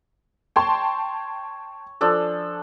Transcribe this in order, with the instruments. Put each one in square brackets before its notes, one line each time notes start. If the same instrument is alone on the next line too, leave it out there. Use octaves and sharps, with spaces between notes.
[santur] C#5 [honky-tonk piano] G5 A5 C6
[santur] F3 D4 A4